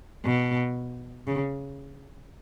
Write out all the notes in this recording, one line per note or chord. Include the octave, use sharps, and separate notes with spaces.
B2
C#3